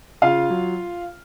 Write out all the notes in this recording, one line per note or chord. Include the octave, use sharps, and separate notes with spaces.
C#3 F4 F5
F#3